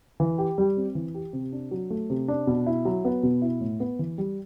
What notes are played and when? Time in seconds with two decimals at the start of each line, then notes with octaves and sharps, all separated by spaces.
0.20 E3
0.38 G4
0.58 G3
0.77 C4
0.95 E3
1.14 G4
1.33 C3
1.52 D4
1.71 F#3
1.90 A3
2.10 C3
2.28 D4
2.47 B2
2.66 E4
2.85 F#3
3.05 B3
3.23 B2
3.42 E4
3.61 A2
3.80 B3
3.99 E3
4.18 G3